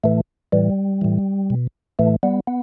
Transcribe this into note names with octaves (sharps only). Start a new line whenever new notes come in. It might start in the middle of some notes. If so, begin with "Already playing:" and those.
A2 E3 A3
A2 E3 G3
A2 E3
B2
A2 E3 A3
G3 B3
B3